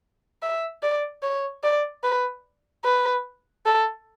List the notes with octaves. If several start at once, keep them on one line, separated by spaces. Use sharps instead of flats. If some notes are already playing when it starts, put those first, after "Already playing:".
E5
D5
C#5
D5
B4
B4
A4